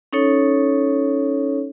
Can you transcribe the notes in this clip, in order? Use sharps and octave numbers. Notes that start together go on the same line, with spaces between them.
C#4 D#4 A4 C#5